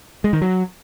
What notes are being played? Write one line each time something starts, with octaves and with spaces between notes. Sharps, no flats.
G#3
D#3
F#3